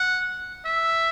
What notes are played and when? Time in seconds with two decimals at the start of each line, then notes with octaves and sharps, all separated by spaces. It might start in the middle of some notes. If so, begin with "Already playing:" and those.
Already playing: F#5
0.65 E5